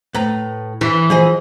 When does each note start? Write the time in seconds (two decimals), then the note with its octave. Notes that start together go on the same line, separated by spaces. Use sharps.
0.15 A2 B4 A#5
0.81 E3
1.10 F3 G#4 D#5